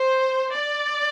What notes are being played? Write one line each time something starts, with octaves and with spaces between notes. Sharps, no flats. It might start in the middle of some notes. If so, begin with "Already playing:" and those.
Already playing: C5
D5